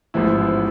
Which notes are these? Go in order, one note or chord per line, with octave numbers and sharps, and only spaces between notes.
A1 G#2 F3 B3 E4